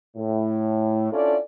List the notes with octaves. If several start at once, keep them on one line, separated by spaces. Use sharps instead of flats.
A2
C#4 D4 E4 F4 A4 D5